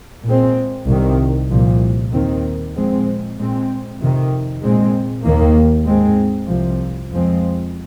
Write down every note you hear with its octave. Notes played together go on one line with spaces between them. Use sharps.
A#2 G#3 C4
C2 C3 D#3
C2 A#2 F3
D#2 D#3 C4
A#2 F3 G#3 C4
A#2 G#3 C4
F2 C3 D#3
A#2 G#3 C4
D#2 D#3 A#3
G#2 G#3 C4
C2 C3 F3
F2 F3 G#3 C4